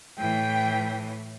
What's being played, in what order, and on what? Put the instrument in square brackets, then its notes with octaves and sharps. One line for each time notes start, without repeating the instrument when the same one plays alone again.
[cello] A2 E3 [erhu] G5